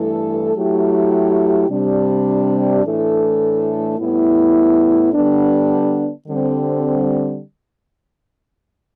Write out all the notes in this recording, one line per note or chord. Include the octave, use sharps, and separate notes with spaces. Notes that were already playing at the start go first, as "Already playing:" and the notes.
Already playing: G2 E3 A3 E4 A4
F#3 A3 E4 G4
C3 G3 D4
A2 E3 A3 D4 A4
A2 G3 B3 E4
D3 G3 B3 D4
D3 G3 C4